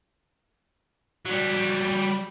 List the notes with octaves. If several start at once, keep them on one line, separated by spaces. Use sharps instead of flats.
F#3 G3